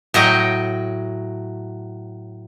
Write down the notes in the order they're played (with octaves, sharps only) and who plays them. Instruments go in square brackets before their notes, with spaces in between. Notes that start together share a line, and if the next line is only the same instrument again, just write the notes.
[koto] A2 F#3 D#5 G5